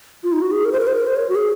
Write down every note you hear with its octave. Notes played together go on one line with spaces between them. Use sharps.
F4
D#4
F#4
G#4
A#4
C5
A#4
C5
A#4
C5
C#5
F#4
G#4